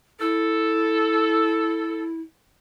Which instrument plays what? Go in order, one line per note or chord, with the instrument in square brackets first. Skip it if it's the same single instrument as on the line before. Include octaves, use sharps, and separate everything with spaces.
[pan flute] E4 [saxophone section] A4